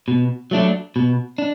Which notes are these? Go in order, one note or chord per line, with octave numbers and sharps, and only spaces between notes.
B2
F#3 A3 D4
B2
D4